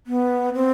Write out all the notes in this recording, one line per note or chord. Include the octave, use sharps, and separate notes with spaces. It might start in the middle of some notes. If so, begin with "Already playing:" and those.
B3
C4